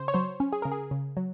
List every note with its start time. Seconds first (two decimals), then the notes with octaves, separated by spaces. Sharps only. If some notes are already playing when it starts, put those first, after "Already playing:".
Already playing: C#3 C5
0.08 C#5
0.14 F#3 C5
0.40 C#4
0.53 G#4
0.62 C#3 A#4
0.72 G#4
0.91 C#3
1.17 F#3